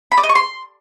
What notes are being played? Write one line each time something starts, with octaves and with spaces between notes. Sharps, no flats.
B5
D5
D#5
C#6
C6